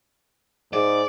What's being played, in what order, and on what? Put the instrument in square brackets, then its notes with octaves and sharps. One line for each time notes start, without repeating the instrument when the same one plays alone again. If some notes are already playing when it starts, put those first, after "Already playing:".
[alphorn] G#2 [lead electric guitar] D5